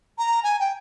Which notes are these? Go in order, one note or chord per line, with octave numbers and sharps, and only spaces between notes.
A#5
G#5
G5